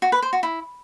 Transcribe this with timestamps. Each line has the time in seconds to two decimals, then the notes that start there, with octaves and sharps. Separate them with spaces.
0.02 F#4
0.12 B4
0.22 C5
0.33 F#4
0.43 E4